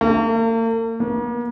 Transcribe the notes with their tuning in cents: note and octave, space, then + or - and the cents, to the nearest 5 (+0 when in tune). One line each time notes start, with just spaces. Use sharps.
A#3 -45
A#3 +45